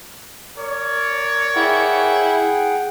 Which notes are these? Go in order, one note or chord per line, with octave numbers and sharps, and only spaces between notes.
A#4 C#5 D5
E4 G#4 F#5 G5